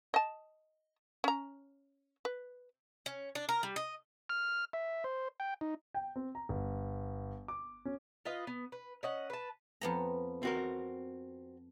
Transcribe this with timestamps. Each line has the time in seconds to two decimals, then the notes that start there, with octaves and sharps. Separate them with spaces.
0.14 D#5 A5
1.24 C#4 A#5
2.25 B4
3.06 C#4
3.35 D4
3.49 A#4
3.63 G3
3.76 D#5
4.30 F6
4.73 E5
5.04 C5
5.40 G5
5.61 D#4
5.94 G5
6.16 C4
6.35 A#5
6.49 G1
7.48 D6
7.85 C#4
8.25 F4 B4 D#5 F5
8.47 B3
8.72 B4
9.03 C#4 D#5 F#5
9.30 B4 A5
9.81 F2 B3 A#5
10.43 C4 F#4 A#4